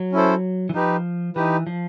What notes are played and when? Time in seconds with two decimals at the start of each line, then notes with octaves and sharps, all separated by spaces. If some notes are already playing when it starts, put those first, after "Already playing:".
Already playing: F#3
0.12 C#4 E4 A4 C5
0.69 E3
0.74 F3 D#4 G4 B4
1.36 E3 D#4 G4 B4
1.67 F3